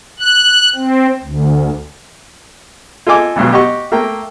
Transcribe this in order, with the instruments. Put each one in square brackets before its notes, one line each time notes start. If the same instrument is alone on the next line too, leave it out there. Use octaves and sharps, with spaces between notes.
[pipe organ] F#6
C4
D2
[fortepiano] F4 A4 D#5 G#5 D6
D2 G2 B2 F#3
G4 D#5 F#5 C#6
A3 A#3 A#4 G5